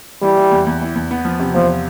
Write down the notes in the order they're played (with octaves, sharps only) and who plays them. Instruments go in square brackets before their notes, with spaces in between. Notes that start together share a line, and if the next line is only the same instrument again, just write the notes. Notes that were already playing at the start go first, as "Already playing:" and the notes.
[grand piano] E3 [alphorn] G3
[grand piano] E3
E2
E2
E3
E2
B3
F3
C3
[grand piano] E2 [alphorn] F3